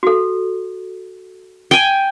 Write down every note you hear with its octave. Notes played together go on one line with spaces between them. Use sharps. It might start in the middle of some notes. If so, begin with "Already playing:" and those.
F#4 A4
G5 G#5